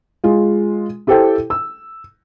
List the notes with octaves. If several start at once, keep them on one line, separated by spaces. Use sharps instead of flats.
G#3 F4
E4 G4 A4 C5 G5
E6